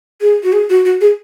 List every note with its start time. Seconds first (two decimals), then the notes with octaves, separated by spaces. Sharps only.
0.21 G#4
0.43 F#4
0.53 G#4
0.70 F#4
0.85 F#4
1.01 G#4